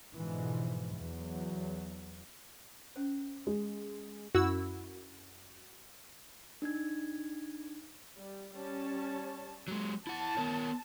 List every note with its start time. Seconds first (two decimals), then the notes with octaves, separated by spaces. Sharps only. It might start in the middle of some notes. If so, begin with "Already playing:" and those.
0.14 G#2 B2 D3 E3 F3 G#3
0.95 E2 F#3
2.96 C#4 C5
3.47 G#3
4.35 F#2 E4 F#4 E6
6.62 D4 D#4 G#6
8.18 G3
8.55 G3 C#4 A5
9.68 F#3 G#3
10.07 E4 F#5 A5
10.37 B3 A#4 C#5